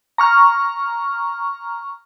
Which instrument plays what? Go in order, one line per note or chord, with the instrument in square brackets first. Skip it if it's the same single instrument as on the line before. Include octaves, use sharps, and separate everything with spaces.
[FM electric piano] A#5 C#6 F6